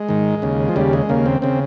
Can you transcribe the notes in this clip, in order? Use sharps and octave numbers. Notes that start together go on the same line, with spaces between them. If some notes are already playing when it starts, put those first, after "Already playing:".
Already playing: G#3
G#2 D#3
D#2 C#3
F3
D#2 C#3 G3
G#3
D#2 C#3 A#3
C4
C#3 C4